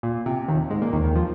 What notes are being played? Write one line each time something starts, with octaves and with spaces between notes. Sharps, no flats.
A#2
C3
D#2 D#3
G#2 G#3
A#2 A#3
D#2 D#3
D#2 D#3
F3